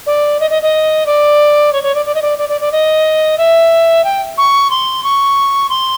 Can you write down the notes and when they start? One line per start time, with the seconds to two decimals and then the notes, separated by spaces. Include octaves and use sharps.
0.06 D5
0.40 D#5
0.50 D#5
0.62 D#5
1.06 D5
1.73 C#5
1.83 C#5
1.95 D5
2.06 D5
2.15 D#5
2.22 D5
2.38 D5
2.49 D5
2.61 D5
2.72 D#5
3.38 E5
4.04 G5
4.38 C#6
4.70 C6
5.04 C#6
5.69 C6